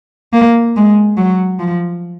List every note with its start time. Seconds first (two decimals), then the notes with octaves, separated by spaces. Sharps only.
0.33 A#3
0.76 G#3
1.17 F#3
1.59 F3